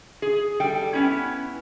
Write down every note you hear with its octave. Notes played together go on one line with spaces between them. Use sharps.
G#4
G3 A4 G5
B3 C#4 E4